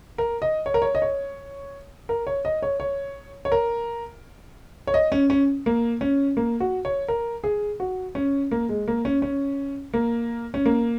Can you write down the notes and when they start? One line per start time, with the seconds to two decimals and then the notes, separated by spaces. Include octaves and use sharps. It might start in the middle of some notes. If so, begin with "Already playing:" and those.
0.18 A#4
0.42 D#5
0.66 C#5
0.74 A#4
0.82 C#5
0.95 D#5
1.02 C#5
2.09 A#4
2.27 C#5
2.45 D#5
2.62 C#5
2.80 C#5
3.45 C#5
3.52 A#4
4.87 C#5
4.94 D#5
5.12 C#4
5.30 C#4
5.66 A#3
6.01 C#4
6.37 A#3
6.60 F#4
6.85 C#5
7.08 A#4
7.44 G#4
7.80 F#4
8.15 C#4
8.51 A#3
8.69 G#3
8.88 A#3
9.05 C#4
9.22 C#4
9.94 A#3
10.54 C#4
10.66 A#3